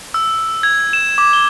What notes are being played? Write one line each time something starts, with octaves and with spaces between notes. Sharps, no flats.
E6
G#6
E7
D6
G7